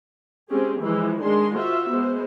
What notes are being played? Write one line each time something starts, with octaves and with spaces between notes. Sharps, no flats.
G#3 C4 C#4 G4 G#4
E3 F3 G#3 E4
D#3 G#3 D4 G#4 C6
F4 F#4 C5 E5
G#3 B3 C5